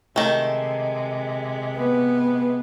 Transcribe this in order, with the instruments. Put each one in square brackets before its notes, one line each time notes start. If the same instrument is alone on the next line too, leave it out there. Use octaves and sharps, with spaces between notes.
[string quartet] C3 G#3 [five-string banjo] D#3 A3
[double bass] B3